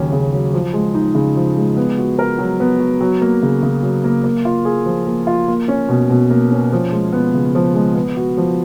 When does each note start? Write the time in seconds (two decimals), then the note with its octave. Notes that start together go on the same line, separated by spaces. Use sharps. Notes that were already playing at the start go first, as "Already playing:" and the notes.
Already playing: D#2 C#3 F#3 C#4
0.12 C#3
0.32 F#3
0.53 F3
0.73 G#3
0.95 D#4
1.15 C#3
1.36 F3
1.56 G#3
1.77 B3
1.98 F#4
2.19 A#4
2.38 F#3
2.60 B3
2.80 F#4
3.01 F#3
3.21 A#3
3.43 C#3
3.63 C#3
3.83 F#3
4.04 A#3
4.24 A#3
4.45 F4
4.65 G#4
4.86 F3
5.07 A#3
5.27 F4
5.48 A#3
5.68 C#4
5.89 B2
6.10 B2
6.30 A#3
6.51 C#4
6.72 F3
6.92 G#3
7.12 B3
7.34 C#3
7.55 F3
7.74 G#3
7.96 B3
8.17 F#4
8.37 F3